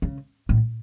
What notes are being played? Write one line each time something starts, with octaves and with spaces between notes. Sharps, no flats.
C#3
A2